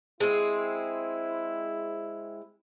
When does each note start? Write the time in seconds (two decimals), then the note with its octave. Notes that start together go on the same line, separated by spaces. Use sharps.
0.20 G#3 C4 E4